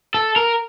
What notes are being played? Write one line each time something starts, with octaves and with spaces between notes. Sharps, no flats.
A4
A#4